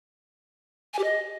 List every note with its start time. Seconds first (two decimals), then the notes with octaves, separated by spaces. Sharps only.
0.94 G#5
0.99 G4
1.04 D#5